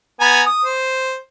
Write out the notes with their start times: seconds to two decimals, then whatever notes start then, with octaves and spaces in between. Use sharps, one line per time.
0.20 B3 G#5 A#5
0.46 D#6
0.65 C5